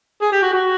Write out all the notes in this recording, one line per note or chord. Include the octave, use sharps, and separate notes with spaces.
G#4
G4
F#4
F#4